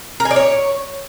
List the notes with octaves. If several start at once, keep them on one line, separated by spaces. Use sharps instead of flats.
A#4
G#5
D5
C#5